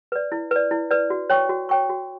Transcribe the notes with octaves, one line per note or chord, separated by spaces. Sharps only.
B4 D5
E4
B4 D5
E4
B4 D5
F#4
C#5 G5 C#6
F#4
C#5 G5 C#6
F#4